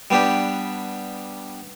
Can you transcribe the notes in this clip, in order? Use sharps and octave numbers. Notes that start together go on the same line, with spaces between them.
G3 B3 D4 G4